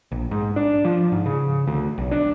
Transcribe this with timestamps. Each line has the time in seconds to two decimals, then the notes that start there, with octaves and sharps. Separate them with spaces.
0.12 A#1
0.31 G#2
0.56 D4
0.85 F3
1.12 G#2
1.26 C#3
1.67 D2
1.98 B1
2.11 D4